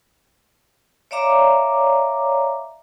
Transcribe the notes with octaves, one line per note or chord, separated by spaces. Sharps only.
C#5 D5 E5 F5 A#5 D6